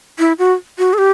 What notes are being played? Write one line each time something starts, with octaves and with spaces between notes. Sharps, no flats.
E4
F#4
F#4
A4
G4